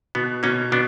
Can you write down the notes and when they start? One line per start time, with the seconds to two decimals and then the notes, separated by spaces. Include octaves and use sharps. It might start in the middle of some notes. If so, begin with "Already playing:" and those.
0.15 B2 B3
0.43 B2 A#3 C#4
0.72 B2 B3 D4